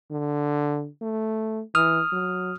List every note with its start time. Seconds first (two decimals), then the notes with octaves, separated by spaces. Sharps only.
0.11 D3
1.02 A3
1.75 E3 D#6 F6
2.12 F#3